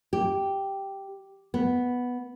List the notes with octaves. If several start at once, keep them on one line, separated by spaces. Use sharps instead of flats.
G4
B3